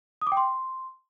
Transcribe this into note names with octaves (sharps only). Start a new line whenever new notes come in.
D#6
D6
G5
C6